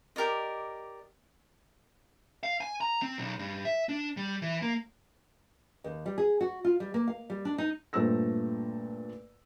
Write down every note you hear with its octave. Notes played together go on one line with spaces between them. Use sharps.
G4 A#4 D5 D#5
F5
G#5
A#5
C4
B1
G2
E5
D4
G3
E3
A#3
D#2
G3
G#4
F#4
F4
G3
A#3
F5
G3
D4
D#4
G2 A#2 A3 C5 E6 A#6